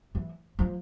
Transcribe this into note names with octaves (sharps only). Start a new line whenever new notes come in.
E3
F3